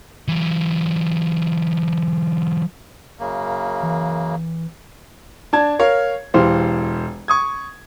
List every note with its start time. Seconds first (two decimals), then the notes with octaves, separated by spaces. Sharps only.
0.28 E3 F#3
3.19 F#2 C#3 A#3
3.83 E3
5.53 D4 A5 G#6
5.79 A#4 C#5 F5
6.34 E1 E3 G4 C5 F5
7.28 C#6 D#6 G#6